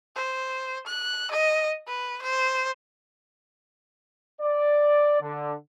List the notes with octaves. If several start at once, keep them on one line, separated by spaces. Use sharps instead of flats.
C5
F#6
D#5
B4
C5
D5
D3